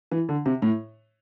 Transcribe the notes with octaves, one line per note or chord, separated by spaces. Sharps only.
E3
D3
C3
A2